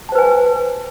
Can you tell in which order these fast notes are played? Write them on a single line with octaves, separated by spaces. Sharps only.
A5 C5 B4 G#5